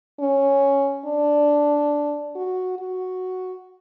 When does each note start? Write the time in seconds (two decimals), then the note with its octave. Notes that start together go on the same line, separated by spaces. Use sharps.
0.20 C#4
1.05 D4
2.35 F#4
2.79 F#4